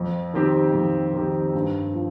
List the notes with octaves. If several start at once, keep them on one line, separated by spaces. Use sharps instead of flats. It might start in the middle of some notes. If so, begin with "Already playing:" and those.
Already playing: F2
D#3 C4 G4
F2
D#3 C4 G4
G2
F3